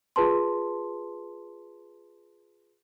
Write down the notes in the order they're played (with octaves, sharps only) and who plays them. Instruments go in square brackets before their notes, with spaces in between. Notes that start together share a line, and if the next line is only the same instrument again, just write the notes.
[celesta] F4 G#4 B4 A5 C6